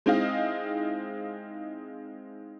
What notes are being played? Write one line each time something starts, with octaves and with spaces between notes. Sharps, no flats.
G#3 C4 D#4 E4 D#5 F5